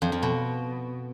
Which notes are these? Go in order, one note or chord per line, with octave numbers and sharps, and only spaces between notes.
F2
F2
B2